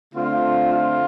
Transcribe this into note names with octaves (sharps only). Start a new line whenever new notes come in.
D3 A3 C4 F4
F4